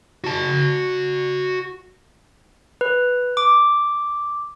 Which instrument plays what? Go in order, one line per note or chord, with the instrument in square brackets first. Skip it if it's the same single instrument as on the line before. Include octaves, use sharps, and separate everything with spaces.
[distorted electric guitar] F#4 A5
[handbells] B4
D6